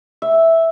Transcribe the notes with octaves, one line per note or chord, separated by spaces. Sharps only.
E5